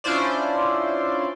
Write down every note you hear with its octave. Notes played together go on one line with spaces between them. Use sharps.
C#4 D4 E4 F4 C5 D5